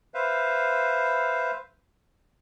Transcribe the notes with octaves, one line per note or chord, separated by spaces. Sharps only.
B4 C5 E5 F5